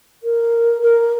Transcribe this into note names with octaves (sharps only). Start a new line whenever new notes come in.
A#4
A#4